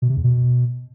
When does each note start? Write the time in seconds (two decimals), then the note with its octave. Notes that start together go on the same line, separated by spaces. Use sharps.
0.02 B2
0.09 C3
0.17 E2
0.24 B2